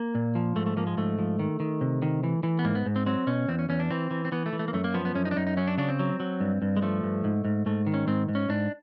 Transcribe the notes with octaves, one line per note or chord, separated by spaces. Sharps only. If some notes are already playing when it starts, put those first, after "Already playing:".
Already playing: A#3
A#2
F3
G#2 A3
A3
F3 A#3
G#3
G#2 A3
F3
D#3
D#3
C3
D#3
E3
E3
B3
G#2 A#3
B3
G#2
C4
F#3 C4
B2 C#4
E2 C4
C#4
E2 C#4
D4
E3 C4
E3
C4
E3 B3
A3
E3
A3
A#3
F#2 A3
A#3
F3 B3
B3
F#2 C#4
D#4
D4
F#2 D#4
D#4
F#3 C#4
D4
C#3 D4
C4
F#3
F#3
G2
G2
G#3
F3 A3
G2
G#2
G#2
G#2 A3
D#3
C#4
G#2 C4
G#2
C#4
G#2 D4